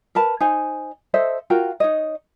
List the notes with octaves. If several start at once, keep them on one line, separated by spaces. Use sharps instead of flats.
A#4 B4 A5
D#4 C5 G#5
A4 C5 D#5 E5
F4 F#4 A#4 G5
D#4 C#5 D#5